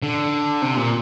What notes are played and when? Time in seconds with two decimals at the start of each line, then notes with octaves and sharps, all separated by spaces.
0.02 D3
0.62 C3
0.76 A#2